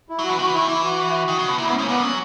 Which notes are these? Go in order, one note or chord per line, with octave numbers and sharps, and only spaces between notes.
E4
F#3
F#4
E3
D#3 F#4
E3
D#3 E4
E3 E4
F#4
D#3
C#3
B2
A#2 E4
G#2 B3
C#4
G#2
A#3
A#2 B3
F#3 C#4